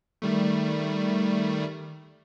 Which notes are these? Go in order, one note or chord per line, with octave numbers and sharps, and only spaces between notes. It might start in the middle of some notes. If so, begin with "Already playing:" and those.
D#3 G3 A3